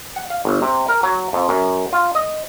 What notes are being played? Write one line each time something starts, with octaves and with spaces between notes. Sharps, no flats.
F#5
F5
G1
C3
A#4
F#3
F2
F#2
F4
D#5